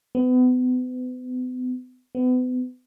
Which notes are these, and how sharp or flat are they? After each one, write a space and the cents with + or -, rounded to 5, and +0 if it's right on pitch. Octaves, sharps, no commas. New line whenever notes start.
B3 +35
B3 +35